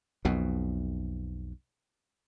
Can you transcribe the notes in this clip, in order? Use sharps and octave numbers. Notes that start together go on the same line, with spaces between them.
B1 F2 B2